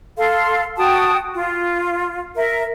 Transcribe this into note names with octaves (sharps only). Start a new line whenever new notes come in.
A4 F5 C6
F#4 G5 A5 D#6
F4
A#4 E5